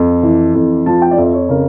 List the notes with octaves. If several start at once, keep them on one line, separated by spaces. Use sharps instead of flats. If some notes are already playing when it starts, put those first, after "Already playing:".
Already playing: F2
E3
F2
F3 A5
G5
D5
F2 E5
C#5
C#3 A#4